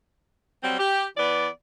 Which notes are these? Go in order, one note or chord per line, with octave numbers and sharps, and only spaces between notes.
F#3 G3 C4
G4
E3 B3 D5